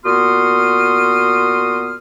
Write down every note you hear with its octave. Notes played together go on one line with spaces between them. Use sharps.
A#2 B3 F#4 C6 D#6 F6